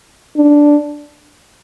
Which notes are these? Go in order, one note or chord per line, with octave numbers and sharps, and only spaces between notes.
D4